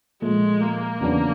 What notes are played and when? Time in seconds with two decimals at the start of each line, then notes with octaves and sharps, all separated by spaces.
0.22 A#2 F3 G#3 A3
0.61 A#3
1.00 E2 C#3 F#3 B3 D4